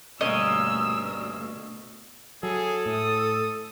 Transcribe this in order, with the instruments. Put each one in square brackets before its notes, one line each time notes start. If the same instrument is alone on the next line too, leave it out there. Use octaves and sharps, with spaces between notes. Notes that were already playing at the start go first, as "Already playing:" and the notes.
[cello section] D2 B2 [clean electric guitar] G2 A#3 C#4 [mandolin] D#5 [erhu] E6
[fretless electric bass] F#3 [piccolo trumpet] G#4 [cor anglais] A4
[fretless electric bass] A2 [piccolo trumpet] D#6